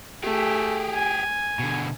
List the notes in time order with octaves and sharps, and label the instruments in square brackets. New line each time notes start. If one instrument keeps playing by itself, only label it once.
[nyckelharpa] A3 [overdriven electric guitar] G4 G#4
[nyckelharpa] G#5
[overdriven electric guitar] B2 D3